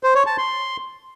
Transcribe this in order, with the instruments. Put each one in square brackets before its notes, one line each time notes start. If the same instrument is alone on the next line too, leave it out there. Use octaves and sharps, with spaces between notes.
[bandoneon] C5
C#5
A5
C6